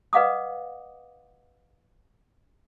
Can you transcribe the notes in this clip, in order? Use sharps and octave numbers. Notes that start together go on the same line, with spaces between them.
B4 D#5 F5 F#5 D6 D#6